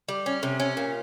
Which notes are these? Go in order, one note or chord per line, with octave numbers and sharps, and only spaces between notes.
G3
C#4
C3
C#4
A#2